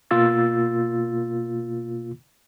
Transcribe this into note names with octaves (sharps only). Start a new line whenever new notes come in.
B2 A#3 F4 E6 A6